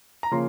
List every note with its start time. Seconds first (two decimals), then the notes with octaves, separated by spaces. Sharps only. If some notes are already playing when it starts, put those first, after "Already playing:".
0.23 A#5
0.31 C#3 F3 A#3 C6